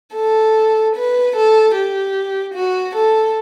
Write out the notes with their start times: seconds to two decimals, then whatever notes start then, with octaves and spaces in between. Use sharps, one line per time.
0.15 A4
0.96 B4
1.36 A4
1.75 G4
2.54 F#4
2.95 A4